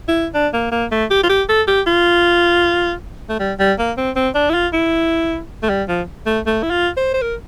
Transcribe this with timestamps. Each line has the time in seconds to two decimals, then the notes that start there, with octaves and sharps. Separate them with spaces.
0.08 E4
0.34 D4
0.53 A#3
0.72 A#3
0.91 A3
1.10 G4
1.23 F4
1.29 G4
1.49 A4
1.68 G4
1.87 F4
3.29 A3
3.39 G3
3.59 G3
3.78 A#3
3.97 C4
4.16 C4
4.35 D4
4.49 E4
4.54 F4
4.73 E4
5.63 A3
5.69 G3
5.88 F3
6.26 A3
6.46 A3
6.63 E4
6.70 F4
6.97 C5
7.14 C5
7.22 A#4